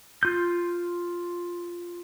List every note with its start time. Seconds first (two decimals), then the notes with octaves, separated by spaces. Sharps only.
0.23 F4 G6